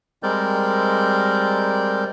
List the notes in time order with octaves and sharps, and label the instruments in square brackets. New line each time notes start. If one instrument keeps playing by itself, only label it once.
[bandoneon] G3 G#3 C4 A#4 D5 G6